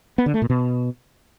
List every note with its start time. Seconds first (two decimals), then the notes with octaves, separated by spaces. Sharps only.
0.18 B3
0.26 D3
0.34 A3
0.42 A#2
0.50 B2